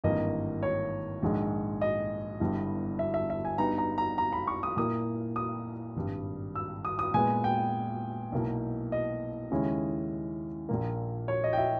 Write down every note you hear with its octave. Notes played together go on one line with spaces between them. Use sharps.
G#1 G2 E3 A#3 D#5
C#5
A#1 G#2 D#3 G#3
D#5
G1 G2 G3 B3 E4
E5
E5
E5
G#5
G2 G3 B3 D#4 A#5
A#5
A#5
A#5
B5
C#6
D#6
A#2 A#3 E4 D#6
D#6
G#1 G2 G3
E6
D#6
D#6
A#2 G#3 B3 G#5
G5
B1 B2 A#3 E4
D#5
D#2 C#3 G#3 C#4 E4
A#1 A#2 A#3
C#5
D#5
G5
E5